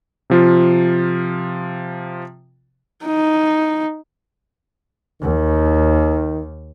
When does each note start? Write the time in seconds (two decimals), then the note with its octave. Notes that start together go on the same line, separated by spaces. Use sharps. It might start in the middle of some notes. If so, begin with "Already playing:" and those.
0.30 C3 F3 F4
3.05 D#4
5.22 D#2 D#3